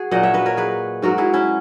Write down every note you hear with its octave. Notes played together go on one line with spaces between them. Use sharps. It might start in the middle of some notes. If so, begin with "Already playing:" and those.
Already playing: F#4 G#4
A#2 F#3 D#5 F#5
C#5 E5
B4 D#5
A#4 C#5
G#4 B4
G#2 F#3 F#4 A#4
E4 G#4
C#4 E4